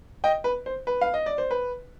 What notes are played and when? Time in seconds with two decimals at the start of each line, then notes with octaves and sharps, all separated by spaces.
0.24 D#5 G5
0.44 B4
0.66 C5
0.87 B4
1.01 F5
1.14 D#5
1.26 D5
1.38 C5
1.51 B4